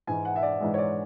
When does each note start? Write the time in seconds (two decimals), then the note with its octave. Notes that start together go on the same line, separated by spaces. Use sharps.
0.07 G#2 E3 G#3 G#5
0.25 F#5
0.36 E5
0.43 D5
0.61 G#2 E3 G#3
0.74 C#5
0.78 D5